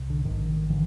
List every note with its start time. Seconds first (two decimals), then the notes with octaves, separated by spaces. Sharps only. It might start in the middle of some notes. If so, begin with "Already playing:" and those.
Already playing: C2 C3
0.10 D3
0.25 A1 G#2 D#3
0.70 D3 E3